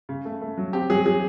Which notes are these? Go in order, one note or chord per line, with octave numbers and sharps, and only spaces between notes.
C#3
A3
A3
F#3
C4 G4
F#3 G#4
F#3 G#4